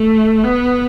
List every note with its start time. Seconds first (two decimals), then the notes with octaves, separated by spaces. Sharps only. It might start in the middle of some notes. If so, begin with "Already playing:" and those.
Already playing: A3
0.44 B3